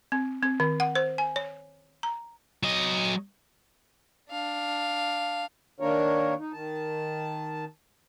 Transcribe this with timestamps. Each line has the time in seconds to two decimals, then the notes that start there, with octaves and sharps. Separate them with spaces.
0.12 C4
0.43 C4
0.60 D#3
0.80 F#5
0.95 C5
1.18 G#5
1.36 C#5
2.03 A#5
2.63 F#3 D#5
4.31 D4 F5
5.80 D#3 A#3 D4 A#4 C#5
6.39 D#4
6.53 D#3 A5